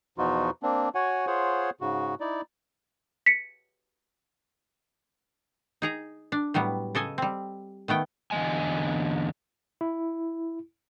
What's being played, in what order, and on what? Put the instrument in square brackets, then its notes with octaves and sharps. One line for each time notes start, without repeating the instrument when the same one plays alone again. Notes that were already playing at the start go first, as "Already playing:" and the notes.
[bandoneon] E2 B2 F3 D#4 F4 F#4
A#3 C4 D4
F#4 C#5 F#5 G#5
F4 G#4 C5 C#5 F#5
G#2 C#3 F#4
D#4 E4 D5
[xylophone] B6 C#7
[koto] D#4 G#4 A#5
D4
A2 F#3 G3 B3
C#3 A4 D#5 G#5
G3 C4
D#3 A3 B3 G5
[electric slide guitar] E2 D3 G#3 D#5 G#5
[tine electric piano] E4